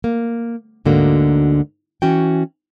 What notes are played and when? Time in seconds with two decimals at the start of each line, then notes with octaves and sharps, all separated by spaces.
0.04 A#3
0.85 D2 G#2 D3 A#3 F#4
2.02 E3 C#4 F#4 G5